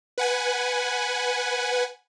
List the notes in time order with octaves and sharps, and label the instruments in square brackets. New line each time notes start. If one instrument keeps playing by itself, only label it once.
[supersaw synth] B4 F#5 G#5